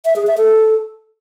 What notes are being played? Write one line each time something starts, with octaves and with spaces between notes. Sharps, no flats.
E5
G#4
E5
A4